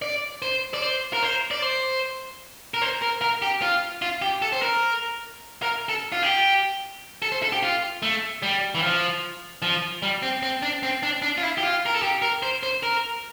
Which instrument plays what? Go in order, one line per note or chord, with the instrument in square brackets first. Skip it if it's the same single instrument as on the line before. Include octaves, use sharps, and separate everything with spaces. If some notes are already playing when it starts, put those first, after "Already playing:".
[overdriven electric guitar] D5
C5
D5
C5
A#4
C5
D5
C5
A#4
C5
A#4
A#4
G4
F4
F4
G4
A4
C5
A#4
A#4
A4
F4
G4
A4
C5
A4
G4
F4
A3
G3
E3
F3
F3
G3
C4
C4
D4
C4
D4
D4
F4
E4
G4
F4
A#4
A4
G4
A#4
C5
C5
A#4